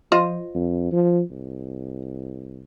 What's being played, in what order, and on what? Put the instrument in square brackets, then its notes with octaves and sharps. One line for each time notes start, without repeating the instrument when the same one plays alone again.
[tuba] F3 [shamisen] F4 C5 D#5
[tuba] F2
F3
C2